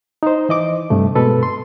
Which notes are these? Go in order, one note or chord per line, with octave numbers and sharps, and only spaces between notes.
D#4 C5
E3 D#5 D6
G2 C3 A3
B2 G#3 A4 B4
C6